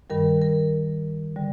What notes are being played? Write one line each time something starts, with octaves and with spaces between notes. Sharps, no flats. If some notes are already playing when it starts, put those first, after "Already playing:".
G2 D#3 G3 A#4
A#4
D3 G3